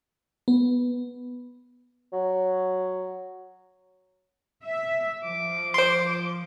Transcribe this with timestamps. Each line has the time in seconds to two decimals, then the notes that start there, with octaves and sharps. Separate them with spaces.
0.48 B3
2.13 F#3
4.64 E5
5.24 F3 D6
5.74 C5 C6